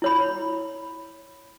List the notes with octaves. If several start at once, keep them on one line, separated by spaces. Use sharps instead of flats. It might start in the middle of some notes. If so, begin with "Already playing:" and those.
E4 C#5 B5